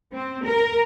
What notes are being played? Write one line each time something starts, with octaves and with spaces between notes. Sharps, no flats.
C4
A#4